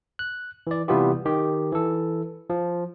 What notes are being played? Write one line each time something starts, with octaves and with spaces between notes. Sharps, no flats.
F#6
E3 D5
C3 E3 G3 B3 F4 G4
D#3 G4
E3 A4
F3